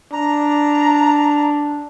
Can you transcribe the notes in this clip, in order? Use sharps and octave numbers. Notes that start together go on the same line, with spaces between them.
D4 A#5